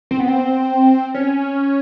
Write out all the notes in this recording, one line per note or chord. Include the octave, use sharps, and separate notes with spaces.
C4
B3
C4
C#4